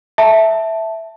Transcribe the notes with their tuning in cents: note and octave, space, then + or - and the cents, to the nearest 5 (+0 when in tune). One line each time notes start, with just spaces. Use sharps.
E5 -5 A5 +0